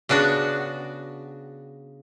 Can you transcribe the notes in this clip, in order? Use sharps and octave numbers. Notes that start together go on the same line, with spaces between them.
C#3 B3 D4 F#4